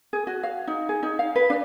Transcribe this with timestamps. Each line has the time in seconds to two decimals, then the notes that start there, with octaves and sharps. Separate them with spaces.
0.13 G#4
0.27 F#4
0.43 F5
0.67 D#4
0.89 G#4
1.03 D#4
1.19 F5
1.36 B4
1.50 D4